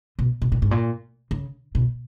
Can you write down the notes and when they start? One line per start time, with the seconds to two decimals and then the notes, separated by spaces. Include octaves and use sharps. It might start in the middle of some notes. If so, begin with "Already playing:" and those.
0.19 B2
0.42 B2
0.52 A#2
0.62 G#2
0.71 A#2
1.31 C#3
1.75 B2